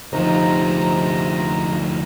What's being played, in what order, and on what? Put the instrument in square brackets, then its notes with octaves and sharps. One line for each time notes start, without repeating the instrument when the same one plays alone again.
[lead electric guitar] D2 F3 [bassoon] C3 [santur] D#4 D#5 [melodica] A#5